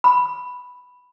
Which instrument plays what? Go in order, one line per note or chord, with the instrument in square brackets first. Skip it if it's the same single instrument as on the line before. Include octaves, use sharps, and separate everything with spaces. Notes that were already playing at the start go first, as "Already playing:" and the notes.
[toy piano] B5